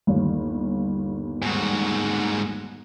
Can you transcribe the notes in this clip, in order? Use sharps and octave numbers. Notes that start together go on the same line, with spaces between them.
G1 D#2
G#2 F#4